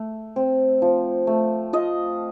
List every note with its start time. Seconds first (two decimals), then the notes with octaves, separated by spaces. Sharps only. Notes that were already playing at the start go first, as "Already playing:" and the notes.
Already playing: A3
0.36 C4
0.82 F3
1.27 A3
1.73 F4 D#5